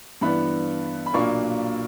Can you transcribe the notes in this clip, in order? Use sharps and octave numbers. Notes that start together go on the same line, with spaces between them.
G2 E3 B3 D4 B5
B5
B1 A#2 A#3 D4 C#6